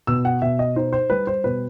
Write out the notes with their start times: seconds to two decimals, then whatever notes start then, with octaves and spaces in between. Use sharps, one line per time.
0.07 B2 E6
0.25 F#5
0.42 B2 E5
0.59 D#5
0.76 D#4 C5
0.93 C5
1.10 G3 B4
1.27 C5
1.44 B2 B4